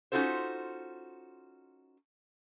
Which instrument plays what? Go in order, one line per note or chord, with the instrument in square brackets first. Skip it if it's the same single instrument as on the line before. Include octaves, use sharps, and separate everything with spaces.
[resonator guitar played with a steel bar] C#4 D#4 F4 F#4 A4 C5